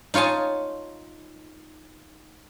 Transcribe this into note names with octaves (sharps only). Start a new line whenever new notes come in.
D#4 F4 C#5 G#5 A5